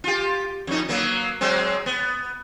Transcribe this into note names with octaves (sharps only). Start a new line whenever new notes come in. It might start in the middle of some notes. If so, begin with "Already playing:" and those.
F4 G4
F2 D#4
F#3 A#3 B3
F#3 G#3 C4
B3